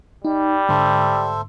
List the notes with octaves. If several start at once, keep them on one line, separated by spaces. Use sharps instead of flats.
G3 D#4
G#2 D3 A4 C5 E5